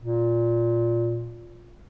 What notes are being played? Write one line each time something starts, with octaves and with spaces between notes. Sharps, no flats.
A#2